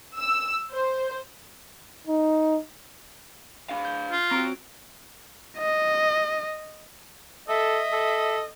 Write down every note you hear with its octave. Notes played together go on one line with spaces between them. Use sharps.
E6
C5
D#4
D4 F5
G6
F4
C4 F#4 A#5 D7
D#5
A4 D#5 E5
A4